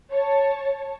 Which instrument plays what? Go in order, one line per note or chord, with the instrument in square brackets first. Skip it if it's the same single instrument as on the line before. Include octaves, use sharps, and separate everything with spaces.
[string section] C#5 A5